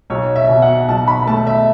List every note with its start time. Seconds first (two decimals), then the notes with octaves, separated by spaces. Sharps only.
0.10 B1 C#5
0.36 E5
0.49 B2
0.62 F#5
0.88 B1 A5
1.08 B5
1.27 A3 A5
1.47 E5